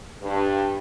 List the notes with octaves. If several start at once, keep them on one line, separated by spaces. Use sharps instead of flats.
G2